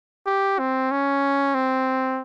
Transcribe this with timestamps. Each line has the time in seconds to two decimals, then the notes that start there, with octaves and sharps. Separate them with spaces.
0.26 G4
0.59 C4
0.91 C#4
1.54 C4